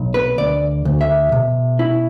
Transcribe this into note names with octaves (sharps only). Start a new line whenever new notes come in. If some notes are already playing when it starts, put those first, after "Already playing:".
Already playing: B1
B4
D2 D5
D2
E5
B2
E4